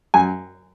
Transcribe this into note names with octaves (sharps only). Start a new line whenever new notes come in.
F#2 G#5